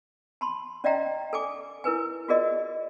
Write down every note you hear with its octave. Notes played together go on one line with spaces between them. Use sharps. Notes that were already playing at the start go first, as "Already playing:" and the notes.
A5 B5 C6
C#4 D5 D#5 F5 G5 A#5
A4 G#5 D6
E4 A#4 B4 G#5
F4 F#4 G#4 A#4 D5 D#5